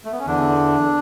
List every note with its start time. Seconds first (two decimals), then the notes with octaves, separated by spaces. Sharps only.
0.05 A3
0.12 B3
0.19 C#4
0.26 E2 D3 D4